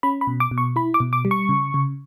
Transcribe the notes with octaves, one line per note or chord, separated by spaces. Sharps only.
C#4 B5
B5
B2
D6
B2
C#6
E4 B5
D6
B2
D6
G3
C#6
C#3
C#3